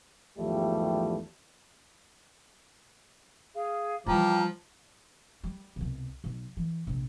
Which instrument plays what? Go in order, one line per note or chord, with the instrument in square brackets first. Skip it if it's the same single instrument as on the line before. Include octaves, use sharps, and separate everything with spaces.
[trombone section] G#1 E2 F3 G3 A3 G4
[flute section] G#4 F5
[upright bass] E3 G3 [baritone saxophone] F3 [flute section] G5 A#5 D6
[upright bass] G3
C2 B2
B1
E3
A#1 C3